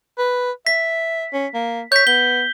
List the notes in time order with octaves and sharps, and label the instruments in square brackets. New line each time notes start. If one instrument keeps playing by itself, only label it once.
[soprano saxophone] B4
[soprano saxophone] E5 [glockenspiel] B6
[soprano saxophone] C#4
A#3
[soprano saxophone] C#5 [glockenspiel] G6 B6
[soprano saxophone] B3 [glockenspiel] G7